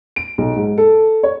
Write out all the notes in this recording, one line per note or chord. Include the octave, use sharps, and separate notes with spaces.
D7
B1
G#2
A4
C#5